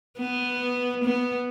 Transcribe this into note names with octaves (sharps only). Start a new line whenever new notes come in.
B3
B3